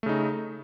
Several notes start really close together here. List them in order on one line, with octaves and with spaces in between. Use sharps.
A3 C#3 D#4